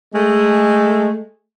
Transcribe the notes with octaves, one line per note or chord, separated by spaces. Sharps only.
G#3 A3